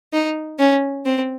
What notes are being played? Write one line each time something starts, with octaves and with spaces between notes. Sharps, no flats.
D#4
C#4
C4